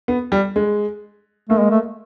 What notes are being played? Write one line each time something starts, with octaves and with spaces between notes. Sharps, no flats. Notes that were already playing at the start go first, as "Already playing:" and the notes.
B3
G3
G#3
A3 A#3
G#3
A3